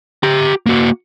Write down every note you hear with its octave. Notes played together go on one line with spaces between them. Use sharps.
G4 A#5
A#3 F#4